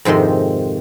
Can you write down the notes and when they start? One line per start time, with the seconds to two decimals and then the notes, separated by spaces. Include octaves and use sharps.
0.05 F2 G#2 C3 D#3 C6